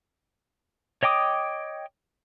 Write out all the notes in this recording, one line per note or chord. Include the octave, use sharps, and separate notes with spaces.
C#5 D#5 G5 D6 D#6